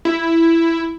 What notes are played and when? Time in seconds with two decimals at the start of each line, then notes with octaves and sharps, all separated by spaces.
0.05 E4